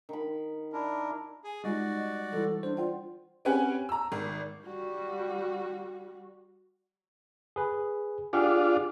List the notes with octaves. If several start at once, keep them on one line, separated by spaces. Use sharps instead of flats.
D#3 B5
D4 E4 A#4
G#4
G3 G#3 D#4 F4 F#4 D5 D#5
E3 G3 E4 A4
D4 C5
F4 D5 F#5 G5
C4 C#4 G4 B4 F#5 G#5
A#5 E6
G#1
G3 F#4
G#4 B4
D4 F4 G4 G#4 F#5